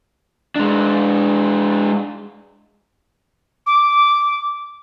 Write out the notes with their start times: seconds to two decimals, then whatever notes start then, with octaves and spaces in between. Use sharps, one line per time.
0.56 G#3 D4
3.66 D6